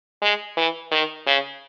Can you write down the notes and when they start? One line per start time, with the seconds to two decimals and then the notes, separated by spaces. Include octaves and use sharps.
0.22 G#3
0.57 E3
0.91 D#3
1.26 C#3